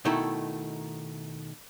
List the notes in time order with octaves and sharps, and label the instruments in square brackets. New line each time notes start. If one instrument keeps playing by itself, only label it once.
[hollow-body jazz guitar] B2 D#3 A3 D#4 E4